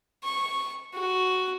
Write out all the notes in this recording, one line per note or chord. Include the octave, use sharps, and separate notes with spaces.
C#6
F#4